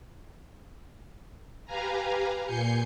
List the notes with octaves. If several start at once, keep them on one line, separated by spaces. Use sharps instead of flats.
G4 B4 F5 G#5 A#5
A#2 G#5 G6 C7 C#7